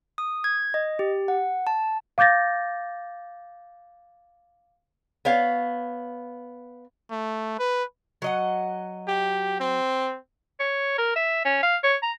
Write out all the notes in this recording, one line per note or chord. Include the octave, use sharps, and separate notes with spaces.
D#6
G#6
D#5
G4
F#5
A5
F5 D6 G6 A6 A#6
B3 C#5 F5
A3
B4
F#3 D#5 F#5
G4
C4
C#5
A#4
E5
C#4
F5
C#5
A#5